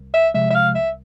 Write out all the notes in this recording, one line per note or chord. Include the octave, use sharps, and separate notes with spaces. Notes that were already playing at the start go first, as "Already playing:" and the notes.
Already playing: C2
E5
C3 F3 G#3 E5
E5
F5
C2 E5